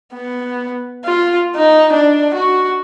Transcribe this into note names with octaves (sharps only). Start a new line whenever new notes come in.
B3
F4
D#4
D4
F#4